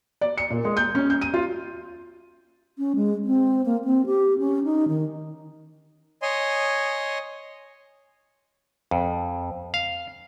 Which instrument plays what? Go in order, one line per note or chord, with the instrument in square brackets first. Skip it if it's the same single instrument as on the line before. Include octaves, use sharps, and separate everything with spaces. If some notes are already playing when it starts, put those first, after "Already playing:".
[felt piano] D5
C#7
A#2
G#3
G6
C#4
G6
D#7
F4
[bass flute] C#4
G#3
C4
A#3
C4
G4
C#4
D#4
D#3
[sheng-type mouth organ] C#5 D#5 G#5 C6
[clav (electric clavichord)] F2
F5